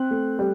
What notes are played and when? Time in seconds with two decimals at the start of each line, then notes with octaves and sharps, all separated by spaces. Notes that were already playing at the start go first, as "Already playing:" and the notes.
Already playing: C4 F#6
0.11 A3
0.39 G3